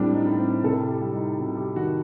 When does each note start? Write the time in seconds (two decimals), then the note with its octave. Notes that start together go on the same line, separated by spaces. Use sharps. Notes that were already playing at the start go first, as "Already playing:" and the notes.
Already playing: A2 G3 C4 D4
0.14 D#4
0.26 A2
0.39 C4
0.63 C3 A4
0.88 G4
1.01 G3
1.14 D#4
1.39 C3 F#4
1.57 G4
1.76 D#3 F#4